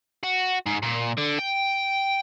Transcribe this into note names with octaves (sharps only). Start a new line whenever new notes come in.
F#4
G#2
A#2
D3
G5